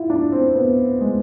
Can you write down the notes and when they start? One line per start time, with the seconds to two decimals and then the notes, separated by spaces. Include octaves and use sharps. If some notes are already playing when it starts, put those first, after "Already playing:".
Already playing: E4 F4
0.10 D4
0.32 C4
0.55 B3
1.01 G#3